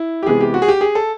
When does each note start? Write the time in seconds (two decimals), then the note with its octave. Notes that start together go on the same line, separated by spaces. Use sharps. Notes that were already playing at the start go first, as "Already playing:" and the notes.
Already playing: E4
0.23 G4
0.26 C3 E3 G#3 B3 G#4
0.41 G4
0.54 F#4
0.62 G#4
0.68 G4
0.81 G#4
0.95 A4